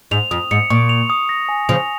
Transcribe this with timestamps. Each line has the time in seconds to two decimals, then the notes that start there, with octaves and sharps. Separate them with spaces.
0.11 G#2 F7
0.31 F2 D#6
0.51 G#2 C#7
0.70 A#2 C#6
0.89 F7
1.10 D#6
1.29 A#6
1.49 G#5
1.69 C#3 F3 F7